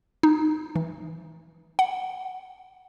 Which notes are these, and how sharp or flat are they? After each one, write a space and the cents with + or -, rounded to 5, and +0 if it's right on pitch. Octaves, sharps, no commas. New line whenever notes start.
D#4 -15
E3 -25
F#5 +0